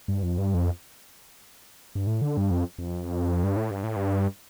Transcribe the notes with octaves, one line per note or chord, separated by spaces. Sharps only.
G2
F2
G2
F2
G2
A2
D3
G2
F2
F2
G2
A2
G2
A2
G2